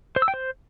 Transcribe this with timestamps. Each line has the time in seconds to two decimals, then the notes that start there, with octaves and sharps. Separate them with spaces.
0.16 C5
0.22 E6
0.28 G5
0.34 C5